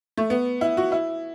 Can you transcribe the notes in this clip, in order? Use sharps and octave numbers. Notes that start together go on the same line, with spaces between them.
A3
B3
E4
F#4
E4